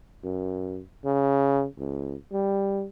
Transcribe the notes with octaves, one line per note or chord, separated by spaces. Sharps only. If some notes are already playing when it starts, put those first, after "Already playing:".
F#2
C#3
C#2
G3